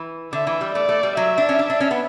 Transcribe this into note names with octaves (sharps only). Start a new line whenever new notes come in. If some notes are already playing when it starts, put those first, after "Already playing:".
Already playing: E3
D3 E5
E3
G3
A3 D5
A3
G3
F#3 E5
D4
C#4
D4
D4
C#4
B3